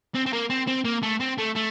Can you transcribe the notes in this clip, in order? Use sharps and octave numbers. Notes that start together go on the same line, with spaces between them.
C4
C4
A#3
C4
C4
A#3
A3
C4
A3
A3